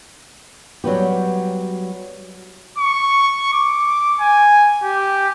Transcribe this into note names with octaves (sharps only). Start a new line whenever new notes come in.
F#3 G3 B3 G4
C#6
D6
G#5
G4